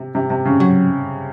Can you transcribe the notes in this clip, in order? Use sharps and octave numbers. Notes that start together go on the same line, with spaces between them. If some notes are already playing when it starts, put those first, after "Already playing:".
Already playing: C3
C3
C3
C#3
F#3